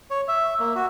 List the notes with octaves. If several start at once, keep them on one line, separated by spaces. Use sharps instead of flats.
C#5
E5
A#3
F#4